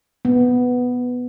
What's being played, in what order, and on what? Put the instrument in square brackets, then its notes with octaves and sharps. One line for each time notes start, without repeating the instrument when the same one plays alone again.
[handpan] B3